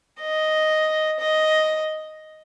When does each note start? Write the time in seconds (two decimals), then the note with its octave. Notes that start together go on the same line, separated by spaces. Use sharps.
0.21 D#5
1.20 D#5